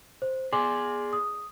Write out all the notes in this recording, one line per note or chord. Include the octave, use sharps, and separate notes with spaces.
C5
G#4 D5 G#5 C6 D6
D#6